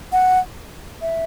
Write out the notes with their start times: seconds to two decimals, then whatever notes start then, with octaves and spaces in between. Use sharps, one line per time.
0.12 F#5
1.01 E5